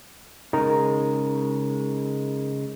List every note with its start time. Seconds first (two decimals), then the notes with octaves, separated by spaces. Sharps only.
0.53 C#3 G#3 D#4 A#4 A#5